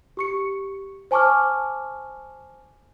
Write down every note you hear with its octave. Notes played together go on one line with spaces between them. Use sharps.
G4 C#6 C#7
C5 G#5 A5 C#6 D6 F6